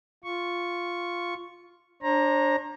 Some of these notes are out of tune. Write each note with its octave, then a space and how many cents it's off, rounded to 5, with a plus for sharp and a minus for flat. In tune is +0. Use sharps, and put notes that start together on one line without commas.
F4 +0 C#6 +0
D4 +0 C5 +45 A#5 +5